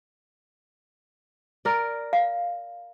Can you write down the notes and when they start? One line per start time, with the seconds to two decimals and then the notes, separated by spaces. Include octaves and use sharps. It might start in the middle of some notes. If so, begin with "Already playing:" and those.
1.65 A#4 D5
2.13 F5